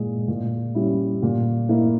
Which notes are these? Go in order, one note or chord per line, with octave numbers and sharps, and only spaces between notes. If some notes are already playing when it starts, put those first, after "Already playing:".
Already playing: A#2 G#3
A#2
G3 C#4 E4
A#2
A#3 E4